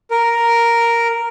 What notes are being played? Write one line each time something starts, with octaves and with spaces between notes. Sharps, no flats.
A#4